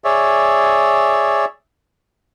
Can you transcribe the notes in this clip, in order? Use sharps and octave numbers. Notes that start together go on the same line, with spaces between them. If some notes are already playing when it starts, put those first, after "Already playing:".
G#4 C#5 D5 E5